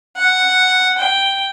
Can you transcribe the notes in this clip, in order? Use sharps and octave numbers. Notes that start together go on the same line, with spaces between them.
F#5
G5